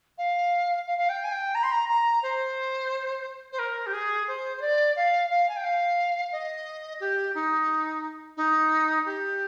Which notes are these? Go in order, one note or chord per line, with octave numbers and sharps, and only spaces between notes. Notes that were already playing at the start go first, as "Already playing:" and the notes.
F5
F5
F5
G5
G#5
G5
A#5
C6
A#5
A#5
C5
C5
A#4
G4
G#4
C5
C5
D5
F5
F5
G#5
G5
F5
D#5
G4
D#4
D#4
G4